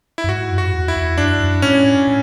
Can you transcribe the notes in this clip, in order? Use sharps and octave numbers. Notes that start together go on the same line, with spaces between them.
E4
F#2
G#2 F#4
F#2
F#4
E2
E4
E2
F#2 D4
F#2
A2 C#4
A2